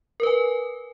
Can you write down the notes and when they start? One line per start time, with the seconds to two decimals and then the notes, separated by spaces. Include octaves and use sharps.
0.20 A#4
0.23 B4
0.27 G#5